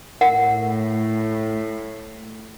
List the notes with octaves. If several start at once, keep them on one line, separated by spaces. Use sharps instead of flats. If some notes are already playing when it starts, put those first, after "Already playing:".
A2 A#4 F#5